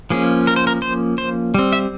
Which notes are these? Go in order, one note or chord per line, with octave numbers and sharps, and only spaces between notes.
F3 A#3 C#4 G#4
A#4
C5
A#4
C5
C5
G3 C4
E5